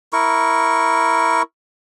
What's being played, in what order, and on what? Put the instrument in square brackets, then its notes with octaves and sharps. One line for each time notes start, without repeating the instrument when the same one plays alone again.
[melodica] E4 A#4 C#6